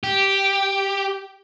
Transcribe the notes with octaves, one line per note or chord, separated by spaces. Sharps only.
G4